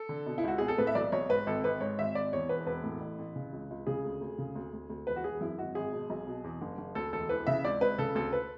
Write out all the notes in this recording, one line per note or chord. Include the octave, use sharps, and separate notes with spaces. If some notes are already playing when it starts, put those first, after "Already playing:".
Already playing: A4
D3
B2
E4
C#2 F#4
B2 G#4
A4
A2 B4
E5
B1 D5
B1 C#5
G#2 B4
G#1 A4
G#1 B4
G#2 C#5
G#1 E5
G#1 D5
E2 C#5
E1 B4
E1 B4
A2
A1
A1
C#3
C#2
C#2
C#3 G#4
D2
D2
C#3
D2
D2
D2
E1 B4
F#4
E1 G#4
F#2 E4
G#1 F#4
G#1 G#4
B2
B1
B2
E2
F#1
F#1
D2 A4
E1 A4
E3 B4
C#3 E5
C#2 D5
C#2 B4
C#3 A4
D2 A4
B4